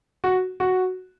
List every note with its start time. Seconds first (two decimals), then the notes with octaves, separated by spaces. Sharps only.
0.24 F#4
0.60 F#4